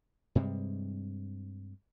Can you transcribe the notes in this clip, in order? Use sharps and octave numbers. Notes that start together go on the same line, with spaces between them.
G2 C3 G3 G#3